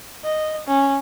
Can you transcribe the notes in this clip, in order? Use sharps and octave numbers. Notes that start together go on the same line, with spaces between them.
D#5
C#4